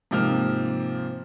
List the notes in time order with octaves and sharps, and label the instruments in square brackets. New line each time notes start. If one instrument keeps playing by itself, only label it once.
[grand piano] G#2 C3 F3 A#3 F6